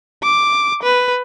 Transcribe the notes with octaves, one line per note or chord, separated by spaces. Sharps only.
D6
B4